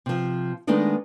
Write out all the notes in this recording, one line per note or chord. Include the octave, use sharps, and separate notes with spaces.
C3 F3
D#3 G#3 A3 B3 D4 D#4